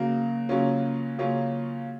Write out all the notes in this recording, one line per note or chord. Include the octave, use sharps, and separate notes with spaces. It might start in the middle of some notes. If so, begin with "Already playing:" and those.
Already playing: C#3 F#3 A#3
C#3 F#3 A#3 C#4 F4
C#3 F#3 A#3 C#4 F4